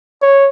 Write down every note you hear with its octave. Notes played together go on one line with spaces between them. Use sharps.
C#5